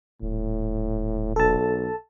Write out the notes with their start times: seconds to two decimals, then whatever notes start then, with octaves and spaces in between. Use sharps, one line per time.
0.22 D#1 A2
1.36 B1 A4 A5